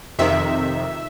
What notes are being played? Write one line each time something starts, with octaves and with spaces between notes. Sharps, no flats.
F2 C3 D#3 E5